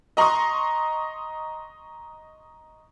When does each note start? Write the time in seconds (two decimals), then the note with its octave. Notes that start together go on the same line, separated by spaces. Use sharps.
0.17 D#5 A#5 C6 C#6 D#6